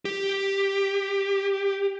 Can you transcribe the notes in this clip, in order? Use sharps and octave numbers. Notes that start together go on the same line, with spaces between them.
G4